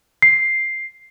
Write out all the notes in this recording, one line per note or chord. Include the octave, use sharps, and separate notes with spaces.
C7